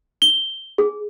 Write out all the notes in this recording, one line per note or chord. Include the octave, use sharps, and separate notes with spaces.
G7
G#4